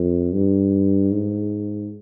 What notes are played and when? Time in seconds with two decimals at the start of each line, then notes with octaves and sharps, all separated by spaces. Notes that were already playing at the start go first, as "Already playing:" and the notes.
Already playing: F2
0.34 G2
1.12 G#2